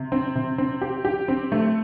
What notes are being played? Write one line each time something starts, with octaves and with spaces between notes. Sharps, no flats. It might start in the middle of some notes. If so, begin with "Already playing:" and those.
Already playing: C3
C4
C3
C4
G4
G4
C4
A3